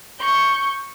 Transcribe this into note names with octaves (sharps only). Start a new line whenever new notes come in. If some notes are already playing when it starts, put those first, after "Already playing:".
C#6 G6